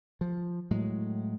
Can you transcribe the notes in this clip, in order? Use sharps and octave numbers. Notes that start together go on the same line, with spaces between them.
F3
A2 F#3 G#3